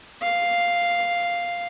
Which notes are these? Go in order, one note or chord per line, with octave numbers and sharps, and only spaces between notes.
F5